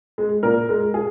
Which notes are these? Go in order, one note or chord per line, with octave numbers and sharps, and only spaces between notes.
G#3
A#2 A#4
G#3 A#4
G#4